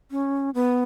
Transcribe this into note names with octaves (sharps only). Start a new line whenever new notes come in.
C#4
B3